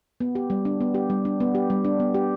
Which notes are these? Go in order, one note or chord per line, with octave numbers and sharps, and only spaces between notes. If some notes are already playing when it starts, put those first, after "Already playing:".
B3
G4
G3
D4
B3
G4
G3
D4
B3
G4
G3
D4
B3
G4